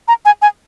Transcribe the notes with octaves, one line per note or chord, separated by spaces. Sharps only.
A#5
G#5
G#5